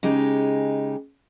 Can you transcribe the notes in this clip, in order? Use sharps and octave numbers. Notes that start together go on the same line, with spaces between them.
C#3 G#3 D#4 G4